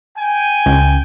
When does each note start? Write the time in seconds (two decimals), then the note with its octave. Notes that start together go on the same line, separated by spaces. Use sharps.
0.17 G5 G#5
0.66 C#2